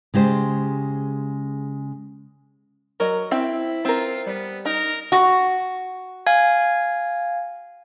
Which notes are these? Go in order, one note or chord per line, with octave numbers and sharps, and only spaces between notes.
C#3 G#3 G4 C5
F#3 A#4 D#5
C4 E4 G5
C4 F4 A#4
G3 B3
D#4 A#4
F#4
F5 G#5 G#6